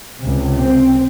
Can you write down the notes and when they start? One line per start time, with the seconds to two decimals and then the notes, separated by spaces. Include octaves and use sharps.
0.19 C#2 C3
0.59 C4